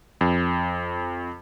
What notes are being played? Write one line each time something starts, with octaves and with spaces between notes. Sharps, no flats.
F2